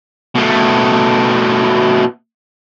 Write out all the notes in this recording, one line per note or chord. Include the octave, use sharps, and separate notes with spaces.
B2 A3